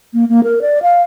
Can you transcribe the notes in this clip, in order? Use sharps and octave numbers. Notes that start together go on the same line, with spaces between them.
A#3
A#3
A#4
D5
F5